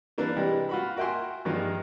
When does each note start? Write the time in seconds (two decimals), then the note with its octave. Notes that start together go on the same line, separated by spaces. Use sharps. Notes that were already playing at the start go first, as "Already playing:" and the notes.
0.18 E3 A#3 D4 B4
0.36 C3 E3 G3 G#3
0.69 F4 F#4 B5
0.97 F#4 A#4 E5 G5 G#5 C6
1.45 G2 D#3 F3 G#3 A#3 F4